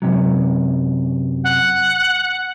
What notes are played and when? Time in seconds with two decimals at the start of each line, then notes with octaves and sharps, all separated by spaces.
0.02 F#2 C3 F#3
1.44 F#5